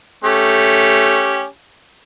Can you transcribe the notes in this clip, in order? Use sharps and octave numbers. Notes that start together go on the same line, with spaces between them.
A3 C#4 G4